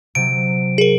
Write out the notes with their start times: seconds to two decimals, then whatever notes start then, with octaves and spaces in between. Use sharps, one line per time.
0.15 C3 F#3 D7
0.78 G#4 A#4